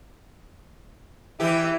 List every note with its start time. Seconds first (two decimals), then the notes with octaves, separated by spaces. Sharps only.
1.40 E3 E4 G4